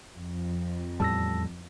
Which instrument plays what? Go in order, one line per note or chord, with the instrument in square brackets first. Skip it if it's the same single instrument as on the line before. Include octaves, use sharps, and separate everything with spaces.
[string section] F2
[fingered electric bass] E2 A2 G3 [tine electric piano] A5 E6 A#6